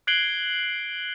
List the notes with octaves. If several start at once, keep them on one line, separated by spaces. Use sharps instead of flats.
F#6 G#6 C7 D7 F#7 G7